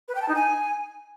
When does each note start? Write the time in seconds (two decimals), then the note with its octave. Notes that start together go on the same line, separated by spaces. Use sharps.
0.08 B4
0.15 G5
0.22 A5
0.28 D#4
0.35 G#5